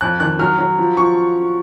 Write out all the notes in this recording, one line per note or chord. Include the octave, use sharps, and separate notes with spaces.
F2 F#6
D#3 F#6
F#3 F6
F#3
F3
F3 C#6